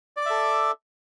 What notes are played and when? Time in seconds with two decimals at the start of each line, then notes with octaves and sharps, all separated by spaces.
0.17 D5
0.21 D6
0.26 E5
0.30 A4